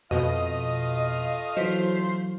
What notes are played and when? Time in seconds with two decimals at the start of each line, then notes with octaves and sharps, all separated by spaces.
0.11 F2 B2 A3 F4 D#5 F5
1.57 E3 F#3 C5 B6